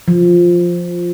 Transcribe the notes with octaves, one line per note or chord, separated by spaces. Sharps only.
F3